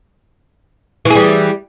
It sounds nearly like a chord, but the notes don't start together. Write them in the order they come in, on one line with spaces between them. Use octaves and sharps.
E3 G#4 G3